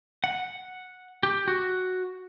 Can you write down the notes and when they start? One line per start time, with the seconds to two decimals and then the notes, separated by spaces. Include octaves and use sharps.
0.24 F#5
1.23 G4
1.48 F#4